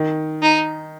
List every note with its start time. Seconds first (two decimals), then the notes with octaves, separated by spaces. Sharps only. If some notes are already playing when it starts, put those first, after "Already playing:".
Already playing: D#3
0.42 D#4